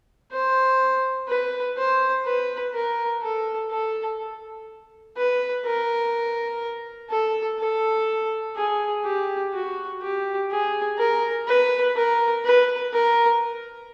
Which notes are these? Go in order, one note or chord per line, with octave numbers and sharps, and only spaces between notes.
C5
B4
C5
B4
A#4
A4
A4
B4
A#4
A4
A4
G#4
G4
F#4
G4
G#4
A#4
B4
A#4
B4
A#4